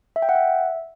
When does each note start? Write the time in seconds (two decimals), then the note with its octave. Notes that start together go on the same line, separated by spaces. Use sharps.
0.16 E5
0.22 G5
0.29 F#5
0.35 E5